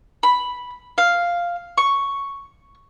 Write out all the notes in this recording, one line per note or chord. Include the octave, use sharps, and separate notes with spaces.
B5
F5
C#6